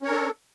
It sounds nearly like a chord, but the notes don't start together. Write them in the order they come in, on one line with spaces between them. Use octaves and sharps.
C#4 C#5 A#4 D4 A4